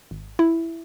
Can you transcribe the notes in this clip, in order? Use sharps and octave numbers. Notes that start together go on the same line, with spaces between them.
G#1
E4